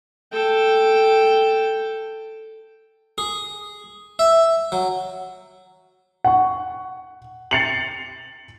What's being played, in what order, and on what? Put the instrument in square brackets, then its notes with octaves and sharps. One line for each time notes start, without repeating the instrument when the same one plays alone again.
[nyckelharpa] A4 G5
[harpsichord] G#4
E5
F#3
[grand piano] F#5 C#6
A6 C7 C#7 F7 F#7